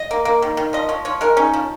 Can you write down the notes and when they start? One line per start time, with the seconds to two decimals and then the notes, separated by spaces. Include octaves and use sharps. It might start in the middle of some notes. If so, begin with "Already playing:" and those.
Already playing: D#5
0.11 A#3
0.25 A#3
0.42 D#3
0.57 D#3
0.73 F3 D#5
0.89 F3 C#5
1.05 F3 C#5
1.21 G#3 A#4
1.37 C#4 D#4
1.54 F3